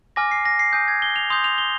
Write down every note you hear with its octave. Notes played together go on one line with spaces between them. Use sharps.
G#5 D6 F6 A#6
C7
A#6
C7
G#5 D#6 G6
G#6
G7
F7
C6 D#6 G6 F7
F7
G7